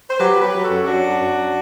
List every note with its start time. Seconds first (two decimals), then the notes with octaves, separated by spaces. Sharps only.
0.10 C5
0.20 F#3 G4 B4
0.37 F#3
0.42 G4 B4
0.53 F#3
0.65 F#4 A4
0.71 F#2
0.83 G4
0.87 F#3 D4 F#4
1.03 F#2
1.20 F#2
1.37 F#3